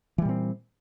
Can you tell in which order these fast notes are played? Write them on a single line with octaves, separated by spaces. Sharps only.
E3 G3 A#2 C4